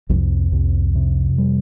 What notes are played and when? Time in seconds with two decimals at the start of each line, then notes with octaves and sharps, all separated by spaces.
0.09 C2 F2
0.52 C2
0.95 C3
1.38 G3